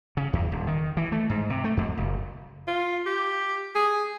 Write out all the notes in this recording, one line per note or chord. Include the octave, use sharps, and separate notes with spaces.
C#3
E2
D#1
D#3
E3
A3
G#2
C3
A3
F2
F#1
F4
G4
G#4